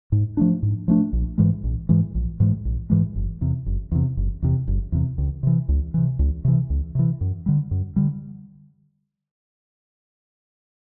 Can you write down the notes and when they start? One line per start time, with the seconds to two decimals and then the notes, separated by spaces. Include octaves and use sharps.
0.12 G#2
0.37 F3 A3 D4
0.63 G#2
0.88 F3 A3 D4
1.13 A#1
1.38 G#2 E3 G#3
1.64 A#1
1.89 G#2 E3 G#3
2.15 A#1
2.40 G#2 E3 G#3
2.65 A#1
2.90 G#2 E3 G#3
3.16 F#1
3.41 E2 C3
3.66 F#1
3.92 E2 C3
4.17 F#1
4.42 E2 C3
4.67 F#1
4.92 E2 C3
5.18 C#2
5.43 C3 E3
5.69 C#2
5.94 C3 E3
6.19 C#2
6.45 C3 E3
6.70 C#2
6.95 C3 E3
7.21 F#2
7.46 D3 G3
7.71 F#2
7.96 D3 G3